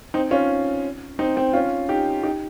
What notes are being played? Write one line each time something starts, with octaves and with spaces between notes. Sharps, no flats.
C4 D#4
C#4 F4
C4 D#4
C4 D#4
C#4 F4
D#4 G4
D#4 G4